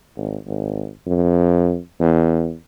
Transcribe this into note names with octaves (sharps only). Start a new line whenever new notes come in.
G#1
G#1
F2
E2